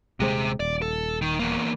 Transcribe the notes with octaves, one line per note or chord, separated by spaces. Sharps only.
D#1 C3 G#3 C4
D#1 D5
A4
D#3
E2 A#3